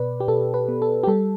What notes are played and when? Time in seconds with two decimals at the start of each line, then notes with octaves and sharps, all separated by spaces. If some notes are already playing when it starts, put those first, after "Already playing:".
Already playing: B2 B4 D5
0.20 G4
0.28 B2 A4
0.54 B4
0.68 B3
0.82 A4
1.03 G4
1.07 G3 A4